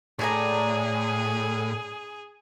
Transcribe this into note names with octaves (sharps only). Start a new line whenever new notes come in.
A2 D4 G#4 G#5 A#5